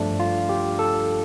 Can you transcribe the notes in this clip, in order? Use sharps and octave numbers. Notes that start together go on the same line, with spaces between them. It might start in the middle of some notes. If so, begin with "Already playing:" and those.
Already playing: G2 F3 A3 D4
F4
G4
A4